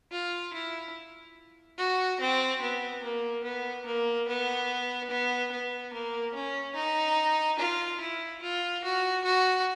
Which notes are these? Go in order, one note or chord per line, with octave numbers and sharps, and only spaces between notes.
F4
E4
F#4
C4
B3
A#3
B3
A#3
B3
B3
B3
A#3
C#4
D#4
F4
E4
F4
F#4
F#4